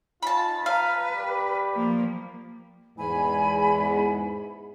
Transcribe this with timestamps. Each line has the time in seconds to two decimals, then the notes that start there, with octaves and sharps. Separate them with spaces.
0.23 D#4 F4 A5 B5
0.66 B4 F5 A5 A#5
1.15 G4 D5 B5
1.74 F3 A#3
2.97 E2 G#2 G#5 B5